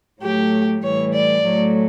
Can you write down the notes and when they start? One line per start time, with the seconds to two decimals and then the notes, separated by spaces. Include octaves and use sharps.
0.22 A2 F#3 A3 G4
0.82 A2 E3 G3 C#5
1.13 D5
1.44 A2 F#3 A3